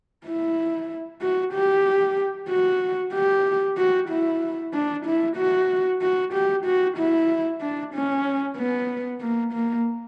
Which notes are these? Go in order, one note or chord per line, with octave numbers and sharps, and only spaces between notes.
E4
F#4
G4
F#4
G4
F#4
E4
D4
E4
F#4
F#4
G4
F#4
E4
D4
C#4
B3
A#3
A#3